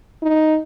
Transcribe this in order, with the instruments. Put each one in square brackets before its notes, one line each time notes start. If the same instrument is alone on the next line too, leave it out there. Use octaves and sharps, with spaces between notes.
[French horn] D#4